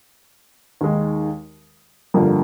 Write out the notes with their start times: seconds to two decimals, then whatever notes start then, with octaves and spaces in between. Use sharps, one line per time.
0.81 D#2 D#3 G#3
2.14 G1 F2 D3 G3 A#3